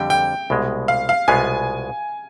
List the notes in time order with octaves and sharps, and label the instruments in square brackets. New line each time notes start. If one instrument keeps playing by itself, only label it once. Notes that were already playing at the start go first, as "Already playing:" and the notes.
Already playing: [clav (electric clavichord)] F2 D3 G3 C4 G4 [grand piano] G5
[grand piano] G5
[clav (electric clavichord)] C2 B2 G#3
[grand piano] F5
F5
[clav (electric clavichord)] C2 B2 G#3 B3 F4 [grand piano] G#5